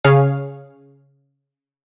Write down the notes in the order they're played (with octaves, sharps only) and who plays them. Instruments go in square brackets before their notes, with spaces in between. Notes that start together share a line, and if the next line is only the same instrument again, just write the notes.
[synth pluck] C#3 G#4 C#5 F5